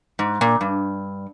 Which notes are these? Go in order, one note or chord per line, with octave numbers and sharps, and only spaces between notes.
G#2
A#2
G2